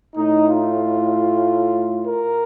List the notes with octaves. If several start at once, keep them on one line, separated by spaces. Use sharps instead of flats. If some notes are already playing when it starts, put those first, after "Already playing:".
A2 A3 D#4
F4
A#4